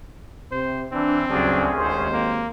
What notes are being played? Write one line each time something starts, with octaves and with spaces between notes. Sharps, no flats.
C3 C5
E3 C4 D4
D2 G2 C#3 F#3 C#4 D4 G#4
G#1 D#2 C5
A#3